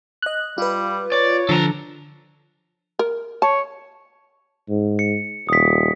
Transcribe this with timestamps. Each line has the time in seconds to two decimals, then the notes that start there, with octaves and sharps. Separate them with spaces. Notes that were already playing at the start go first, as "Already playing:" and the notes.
0.22 D#5 F#6
0.58 G3 F4 B4
1.12 C#5 D5
1.49 D3 F3 A4 A#5
2.99 A#4
3.42 C#5 A5
4.69 G#2
4.99 C#7
5.49 D#1 D#6 B6